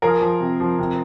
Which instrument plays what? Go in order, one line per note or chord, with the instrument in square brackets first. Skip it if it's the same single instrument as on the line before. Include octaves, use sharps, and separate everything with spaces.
[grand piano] F3 G#4 A#4
F3
C3
F3
C3